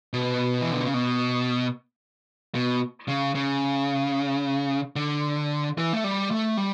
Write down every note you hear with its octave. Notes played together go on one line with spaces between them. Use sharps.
B2
E3
D3
C#3
B2
B2
C#3
C#3
D3
E3
A3
G3
A3
G3